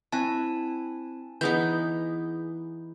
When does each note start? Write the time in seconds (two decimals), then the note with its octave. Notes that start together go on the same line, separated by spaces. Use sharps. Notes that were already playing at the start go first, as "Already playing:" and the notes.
0.12 C4 E4 G#5 A5
1.41 E3 B3 D#4 G#4 G6